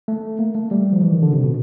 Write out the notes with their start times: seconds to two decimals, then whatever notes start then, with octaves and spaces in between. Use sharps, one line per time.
0.08 A3
0.39 A#3
0.55 A3
0.71 G3
0.93 F3
1.02 E3
1.12 D#3
1.22 D3
1.33 C3
1.44 B2